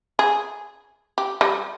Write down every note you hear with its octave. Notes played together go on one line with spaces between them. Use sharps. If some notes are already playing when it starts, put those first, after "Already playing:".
G#4
G4
G3